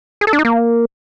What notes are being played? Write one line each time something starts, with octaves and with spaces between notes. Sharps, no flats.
G#4
A4
D4
D#4
A#3